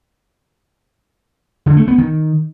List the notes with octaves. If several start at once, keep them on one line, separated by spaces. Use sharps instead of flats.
D3
A3
B3
D#3